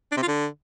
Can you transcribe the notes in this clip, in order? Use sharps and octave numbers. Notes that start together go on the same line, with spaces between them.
D4
C3
F4
D3